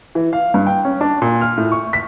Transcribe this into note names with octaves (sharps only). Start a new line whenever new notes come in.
E3
F5
G2
G5
C#4
D4
A#2
F6
A2
C#6
B6